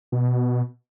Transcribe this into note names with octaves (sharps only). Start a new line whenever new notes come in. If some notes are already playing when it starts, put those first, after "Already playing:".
B2